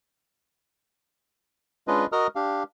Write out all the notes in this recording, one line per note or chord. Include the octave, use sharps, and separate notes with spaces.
G#3 C#4 D4 F4 B4 D#5
F#4 A#4 D#5 A#5 D#6 F6
D4 G4 F5